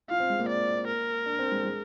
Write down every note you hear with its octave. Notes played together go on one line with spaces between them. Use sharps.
F4 F5
C4
G#3
A#3
D5
A#4
D4
C4
G#3
G#3